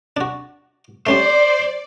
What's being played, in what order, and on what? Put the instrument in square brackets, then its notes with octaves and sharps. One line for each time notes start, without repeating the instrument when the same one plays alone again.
[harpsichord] D4 F#4
[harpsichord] A3 C#4 G4 [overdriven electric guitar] C5 [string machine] D5